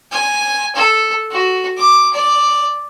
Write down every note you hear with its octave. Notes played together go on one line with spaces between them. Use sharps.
G#5
A4
F#4
D6
D5